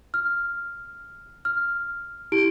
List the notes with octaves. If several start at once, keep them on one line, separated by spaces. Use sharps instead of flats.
F6
F6
E4 G4 D7